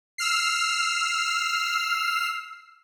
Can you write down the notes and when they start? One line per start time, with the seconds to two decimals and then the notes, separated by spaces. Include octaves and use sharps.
0.18 E6 F6 C7